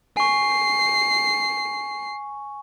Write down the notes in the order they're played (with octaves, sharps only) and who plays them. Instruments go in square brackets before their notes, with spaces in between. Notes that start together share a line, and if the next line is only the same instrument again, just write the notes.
[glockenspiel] G#5 C#6 [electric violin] C7